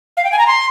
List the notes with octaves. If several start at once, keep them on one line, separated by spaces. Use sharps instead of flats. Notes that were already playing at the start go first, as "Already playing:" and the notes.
F5
G5
G#5
A#5
C6